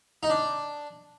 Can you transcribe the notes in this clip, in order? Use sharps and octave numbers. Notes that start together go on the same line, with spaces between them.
D#4
D4